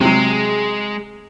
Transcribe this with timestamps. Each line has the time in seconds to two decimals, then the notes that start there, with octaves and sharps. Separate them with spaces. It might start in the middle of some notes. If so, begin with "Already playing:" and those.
0.01 C3 F#3 G#3